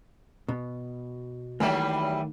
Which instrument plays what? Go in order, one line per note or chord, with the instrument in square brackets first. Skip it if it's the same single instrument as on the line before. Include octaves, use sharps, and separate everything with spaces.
[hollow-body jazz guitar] B2
[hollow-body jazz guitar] D#3 A3 A#3 [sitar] E3 F#3 G3